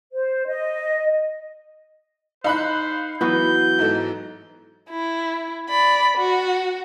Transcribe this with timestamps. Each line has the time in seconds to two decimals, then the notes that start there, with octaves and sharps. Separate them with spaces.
0.13 C5
0.46 D#5
2.44 D#4 C5 F5 B5 F#6
3.21 E3 F#3 B3 F#4 G6
3.79 G#2 D#4 A4
4.89 E4
5.70 D5 B5
6.17 F#4